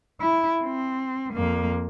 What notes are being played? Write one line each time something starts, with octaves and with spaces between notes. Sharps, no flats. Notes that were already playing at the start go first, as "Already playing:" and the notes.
E4
C4
F2 A#3